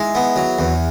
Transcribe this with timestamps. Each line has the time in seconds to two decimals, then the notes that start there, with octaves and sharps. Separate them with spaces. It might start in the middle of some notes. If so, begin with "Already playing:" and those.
Already playing: G#3 E4 G#4
0.15 B3
0.36 F#3
0.59 E2